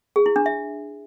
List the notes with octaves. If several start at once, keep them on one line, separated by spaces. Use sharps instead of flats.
G#4
E4
D4
E5